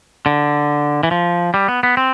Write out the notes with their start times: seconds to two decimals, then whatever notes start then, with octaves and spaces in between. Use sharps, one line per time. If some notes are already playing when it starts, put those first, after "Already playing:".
0.26 D3
1.03 E3
1.11 F3
1.54 G3
1.68 B3
1.83 B3
1.97 C4